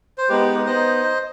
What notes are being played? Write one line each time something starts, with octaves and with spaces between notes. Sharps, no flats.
C5
G#3 B3 D#4 G4 B4
B3 D#4 C5 D#5